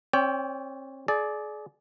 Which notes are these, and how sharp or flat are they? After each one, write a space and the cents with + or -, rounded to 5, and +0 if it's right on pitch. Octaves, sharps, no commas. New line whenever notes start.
C4 +40 C#5 +45 G5 +0
G#4 +35 D5 +0